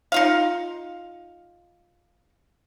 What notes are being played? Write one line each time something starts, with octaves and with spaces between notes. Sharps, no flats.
D#4 F4 F5